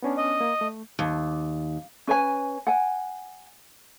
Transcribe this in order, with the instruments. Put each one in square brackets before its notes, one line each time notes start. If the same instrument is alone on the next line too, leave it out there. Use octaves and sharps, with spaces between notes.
[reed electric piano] B3 C#4 D4
[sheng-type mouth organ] D#5
[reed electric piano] A#3
A3
[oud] D#2
[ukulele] C#4 B4 C#5 G#5
F#5 G#5